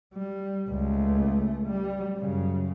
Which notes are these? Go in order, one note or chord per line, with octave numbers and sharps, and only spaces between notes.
G3
C#2 A3
G3
F#2 C#3